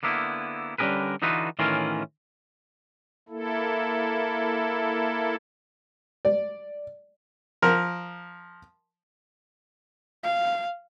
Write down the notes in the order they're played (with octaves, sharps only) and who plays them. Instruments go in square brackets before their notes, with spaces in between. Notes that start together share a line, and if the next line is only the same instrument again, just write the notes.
[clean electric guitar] D3 A#3 B3 E4
D3 G3 C#4 G#4 A#4 B4
D3 E3 D#4 F4 F#4 B4
A2 D#3 E3 C#4 F4 A#4
[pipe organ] A#3 E4 A4
[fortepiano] D5
F3 A#4
[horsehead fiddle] F5